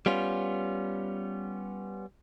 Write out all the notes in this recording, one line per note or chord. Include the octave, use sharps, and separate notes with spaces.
G3 B3 C#4 F4